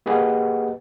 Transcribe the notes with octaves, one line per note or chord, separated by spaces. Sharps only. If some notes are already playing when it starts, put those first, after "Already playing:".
A#3 G4 G#4 B4 D#5 F#5